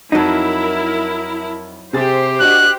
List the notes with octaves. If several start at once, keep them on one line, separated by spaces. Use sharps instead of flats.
F2 F#3 D#4 E4 A#4 A5
C3 G4 G#4 C5 A6
D4 F#4 D#5 F#6